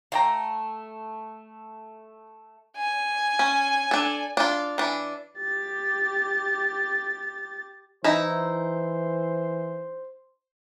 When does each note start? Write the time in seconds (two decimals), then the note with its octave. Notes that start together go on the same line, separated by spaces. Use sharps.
0.12 A3 F5 G5 A#5
2.77 G#5
3.39 C#4
3.91 D4 A4
4.37 D4 F4
4.78 E3 D4
5.38 G4 A6
8.04 E3 D#4 E4 C5